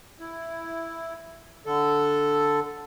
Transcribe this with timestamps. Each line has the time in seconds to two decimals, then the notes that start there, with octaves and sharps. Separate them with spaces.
0.20 E4
1.66 D3 A4